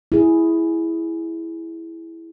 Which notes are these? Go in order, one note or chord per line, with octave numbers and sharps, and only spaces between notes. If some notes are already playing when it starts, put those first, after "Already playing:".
E4 G#4